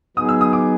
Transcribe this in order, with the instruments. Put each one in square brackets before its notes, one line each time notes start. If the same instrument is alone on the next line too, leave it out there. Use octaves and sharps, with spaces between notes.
[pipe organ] F#3 B3 D#4 G#4 [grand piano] D#6
[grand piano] E6
D#6
D6